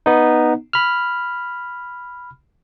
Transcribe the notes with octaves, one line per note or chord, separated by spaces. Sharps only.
B3 D#4
B5 F6